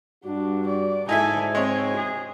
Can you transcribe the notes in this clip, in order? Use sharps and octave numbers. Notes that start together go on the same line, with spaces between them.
G2 D4 F#4
D5
G#2 D#4 E4 A4 E5 G#5
G#3 C4 C#5 G#5
G#4